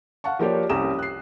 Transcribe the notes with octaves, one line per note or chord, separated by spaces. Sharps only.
F5 F#5 A5 C#6
F3 A#3 G4 C#5 D5
C2 C#4 G4 A#5 D#6 E7
F#6 C7